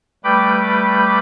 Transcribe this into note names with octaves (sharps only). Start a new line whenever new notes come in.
G3 A3 B4 G5 B5 D6